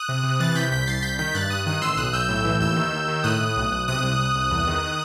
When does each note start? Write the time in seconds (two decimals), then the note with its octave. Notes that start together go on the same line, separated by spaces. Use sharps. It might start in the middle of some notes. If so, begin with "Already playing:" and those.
Already playing: D#6 F#6
0.09 C3
0.24 C3
0.40 E3 F#6 A6
0.55 C3 G6 B6
0.71 C2 G6 B6
0.87 C2 A6 C7
1.02 C2 G6 B6
1.19 D#3 G6 B6
1.34 G2 F#6 A6
1.50 G2 D#6 F#6
1.66 D#3 D#6 F#6
1.81 A1 C6 E6
1.94 E6
1.97 B1 D#6 F#6
2.13 B1 E6 G6
2.29 A2
2.45 E3
2.60 D#2 E6 G6
2.76 D#3
2.92 D#2
3.08 D#3
3.24 A2 D#6 F#6
3.41 A2
3.56 B1
3.72 B1
3.88 C3 D#6 F#6
4.03 C2
4.19 C2
4.35 C2
4.51 E2
4.67 D#3